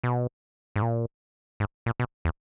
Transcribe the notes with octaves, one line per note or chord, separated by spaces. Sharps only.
B2
G#2
A#2
G#2
A#2
B2
E2